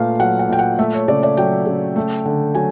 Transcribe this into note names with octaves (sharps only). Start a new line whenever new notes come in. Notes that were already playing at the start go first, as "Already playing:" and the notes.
Already playing: A#2 A3 B4 F5
F#3 F#5
F#5
A#2 G5
F#5
A3 E5
C#5
C#3 D5
D5
F#3 G5
C#3
A3
D3
F#3 G#5